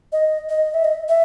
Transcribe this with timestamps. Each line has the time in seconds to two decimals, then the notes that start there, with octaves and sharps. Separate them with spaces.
0.13 D#5
0.49 D#5
0.74 E5
0.85 D#5
1.09 E5